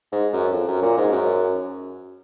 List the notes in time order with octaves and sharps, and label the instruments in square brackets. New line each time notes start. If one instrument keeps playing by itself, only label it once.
[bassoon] G#2
F#2
F2
F#2
A#2
G#2
F#2